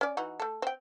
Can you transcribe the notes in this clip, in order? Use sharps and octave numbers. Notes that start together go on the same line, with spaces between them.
C#4 D5
E3 D#4 F#4
A3 A4
C4 G5